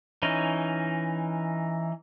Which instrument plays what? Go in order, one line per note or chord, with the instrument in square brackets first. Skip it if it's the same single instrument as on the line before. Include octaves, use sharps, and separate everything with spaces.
[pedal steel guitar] E3 C#4 D#4